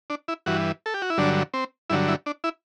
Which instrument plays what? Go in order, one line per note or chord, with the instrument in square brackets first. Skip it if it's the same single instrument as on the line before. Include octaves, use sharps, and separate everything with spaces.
[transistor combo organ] D4
E4
G2 E3 F#4
A4
G4
F#4
E4
G2 D3 F#3 D4
C4
G2 D3 F#3 E4
E4
D4
E4